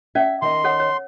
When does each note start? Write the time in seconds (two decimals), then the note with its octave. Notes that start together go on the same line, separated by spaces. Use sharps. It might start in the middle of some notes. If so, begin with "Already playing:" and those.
0.15 C#4 D5 E5
0.42 D#3 D#5 C6
0.64 A4 C#5 F#5
0.80 C#5